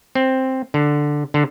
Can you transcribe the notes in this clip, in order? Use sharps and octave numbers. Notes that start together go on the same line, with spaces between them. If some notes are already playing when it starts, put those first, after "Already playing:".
C4
D3
D3